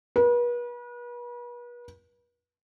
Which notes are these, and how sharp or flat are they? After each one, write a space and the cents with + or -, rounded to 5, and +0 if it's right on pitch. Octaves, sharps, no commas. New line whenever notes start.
B4 -40